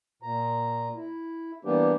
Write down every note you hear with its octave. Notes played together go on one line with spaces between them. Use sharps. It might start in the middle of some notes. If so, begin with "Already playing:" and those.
A#2 A#5
E4
E3 G3 A#3 B3 D4 G4